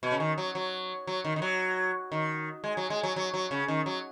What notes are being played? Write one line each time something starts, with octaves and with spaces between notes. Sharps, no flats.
B2
C#3
D#3
F#3
F#3
F#3
D#3
D#3
F#3
D#3
G#3
F#3
G#3
F#3
F#3
F#3
C#3
D#3
F#3